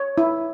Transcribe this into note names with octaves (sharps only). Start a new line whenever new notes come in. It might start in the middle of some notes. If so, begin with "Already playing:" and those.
Already playing: C#5
E4